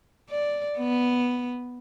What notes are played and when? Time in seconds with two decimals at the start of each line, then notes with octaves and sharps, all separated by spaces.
0.30 D5
0.78 B3